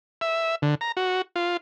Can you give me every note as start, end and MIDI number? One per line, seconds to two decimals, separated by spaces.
0.21 0.55 76
0.62 0.75 50
0.81 0.92 82
0.97 1.22 66
1.36 1.57 65